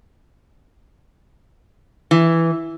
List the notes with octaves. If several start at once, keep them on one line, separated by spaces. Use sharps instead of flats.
E3